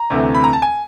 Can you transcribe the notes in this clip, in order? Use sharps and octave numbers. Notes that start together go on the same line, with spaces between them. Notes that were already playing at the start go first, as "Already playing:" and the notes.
Already playing: A#5
D2 C3 E3 A3
B5
A#5
A5
G#5